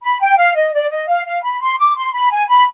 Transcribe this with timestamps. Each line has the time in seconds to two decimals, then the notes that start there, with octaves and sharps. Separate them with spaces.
0.03 B5
0.21 G5
0.37 F5
0.55 D#5
0.73 D5
0.90 D#5
1.08 F5
1.26 F5
1.43 B5
1.61 C6
1.78 D6
1.96 C6
2.13 B5
2.30 G#5
2.48 B5